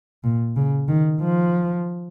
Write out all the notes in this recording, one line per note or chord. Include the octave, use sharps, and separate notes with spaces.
A#2
C#3
D#3
F3